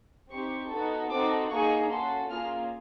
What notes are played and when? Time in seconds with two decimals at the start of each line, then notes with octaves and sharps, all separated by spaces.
0.30 C4 D#4 G4 C#6
0.70 B3 D#4 F#4 A4
1.09 C4 D#4 F#4 A4 D6
1.50 A#3 D#4 G#4 C#6
1.89 C#4 F#4 A4 C6
2.29 A#3 C#4 F4 G#4 F6